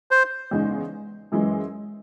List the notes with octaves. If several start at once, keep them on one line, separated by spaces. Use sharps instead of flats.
C5
E2 C#3 G#3 D#4
F#2 E3 G#3